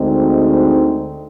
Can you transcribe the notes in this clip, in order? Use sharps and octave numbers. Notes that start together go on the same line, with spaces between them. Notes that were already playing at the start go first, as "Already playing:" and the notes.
Already playing: D2 D3 G#3 C4 D#4